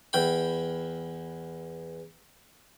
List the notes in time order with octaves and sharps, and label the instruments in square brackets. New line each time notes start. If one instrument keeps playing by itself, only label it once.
[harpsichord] E2 G5 B5